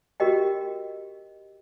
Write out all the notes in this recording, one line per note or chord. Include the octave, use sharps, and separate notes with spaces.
F#4 G4 A#4 D#5 G5